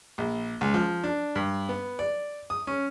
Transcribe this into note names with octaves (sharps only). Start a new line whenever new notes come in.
A#1
C#2
F3
D4
G2
B3
D5
D#6
C#4